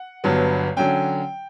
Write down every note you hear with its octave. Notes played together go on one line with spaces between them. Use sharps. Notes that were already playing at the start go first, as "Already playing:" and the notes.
Already playing: F#5
G1 G2 F#3 B3
D3 F#3 C#4 G5